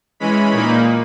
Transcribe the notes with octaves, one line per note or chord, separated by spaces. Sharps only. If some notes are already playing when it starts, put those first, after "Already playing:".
E3 G#3 C#4 B5
A#2 A#3 D#4